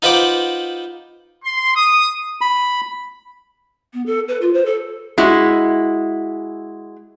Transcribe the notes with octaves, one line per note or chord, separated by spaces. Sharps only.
D#4 F4 B4 C5 F#5 D6
C6
D#6
B5
B3
A4
B4
F4
C5
A4
G#3 E4 F#4